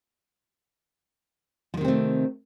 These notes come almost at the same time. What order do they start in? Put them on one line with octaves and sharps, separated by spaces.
F3 D#3 C3 C4 A3